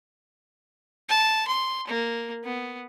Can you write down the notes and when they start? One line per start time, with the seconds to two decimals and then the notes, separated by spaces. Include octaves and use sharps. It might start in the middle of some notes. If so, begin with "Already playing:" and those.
1.09 A5
1.48 C6
1.87 A#3
2.44 B3